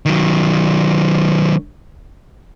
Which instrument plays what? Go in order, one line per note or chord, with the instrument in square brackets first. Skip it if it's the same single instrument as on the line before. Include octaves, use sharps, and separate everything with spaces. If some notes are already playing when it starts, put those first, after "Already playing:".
[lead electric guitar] D#3 F#3